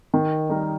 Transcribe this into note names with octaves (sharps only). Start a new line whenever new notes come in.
D#3
G3 D#4 A#4